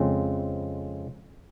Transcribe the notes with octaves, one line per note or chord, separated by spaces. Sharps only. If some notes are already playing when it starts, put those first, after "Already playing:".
Already playing: F2 C#3 G#3 C4